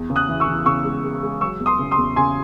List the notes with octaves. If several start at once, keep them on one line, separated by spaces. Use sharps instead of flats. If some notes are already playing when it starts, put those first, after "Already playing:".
Already playing: E2
C#3
D#6 F#6
E3
C#6 E6
E3
C#3 C#6 E6
G#3
G#3
G#3
F#3 C#6 E6
E2
C6 D#6
C#3
C6 D#6
E2
C#3 G#5 C6